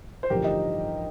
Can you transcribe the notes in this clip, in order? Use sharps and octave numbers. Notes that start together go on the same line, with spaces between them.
C5
A1 G2 D3 F3 G4 A#4
D#4 G4